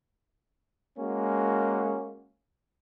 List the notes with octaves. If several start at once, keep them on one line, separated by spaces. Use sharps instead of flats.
G#3 A#3 C#4 F#4